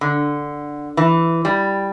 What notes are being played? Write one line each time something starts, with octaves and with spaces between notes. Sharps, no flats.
D3
E3
G3